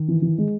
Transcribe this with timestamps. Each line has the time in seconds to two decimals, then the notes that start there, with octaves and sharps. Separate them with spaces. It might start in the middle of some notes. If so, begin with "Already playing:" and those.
Already playing: D#3
0.08 E3
0.22 E3
0.38 G#3